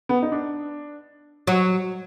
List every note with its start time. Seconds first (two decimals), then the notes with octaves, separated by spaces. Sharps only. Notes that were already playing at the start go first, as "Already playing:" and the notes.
0.09 B3
0.23 D#4
0.32 D4
1.47 F#3